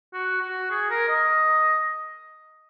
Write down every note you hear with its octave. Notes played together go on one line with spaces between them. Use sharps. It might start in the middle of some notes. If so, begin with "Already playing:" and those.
F#4
F#4
G#4
A#4
D#5